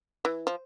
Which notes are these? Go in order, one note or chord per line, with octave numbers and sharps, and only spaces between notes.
E3
F3